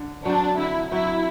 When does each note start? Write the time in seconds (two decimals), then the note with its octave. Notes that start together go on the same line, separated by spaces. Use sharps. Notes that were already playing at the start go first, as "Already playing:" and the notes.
Already playing: D3
0.25 F#3 C4 D4
0.57 D3 E4
0.91 F#3 C4 E4